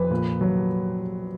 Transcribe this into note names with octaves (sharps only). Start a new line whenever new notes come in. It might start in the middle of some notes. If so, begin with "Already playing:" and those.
Already playing: F2 B4
A#2
F#3